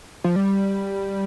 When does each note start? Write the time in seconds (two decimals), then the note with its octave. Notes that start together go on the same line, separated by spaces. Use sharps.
0.24 F3
0.36 G3